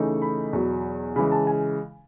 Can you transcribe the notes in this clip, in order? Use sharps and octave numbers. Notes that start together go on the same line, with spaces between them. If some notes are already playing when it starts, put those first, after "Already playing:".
Already playing: C#3 E3 A3 D#4
B5
E2 B2 F#3
C#3 E3 G#3 B5
A5
G#5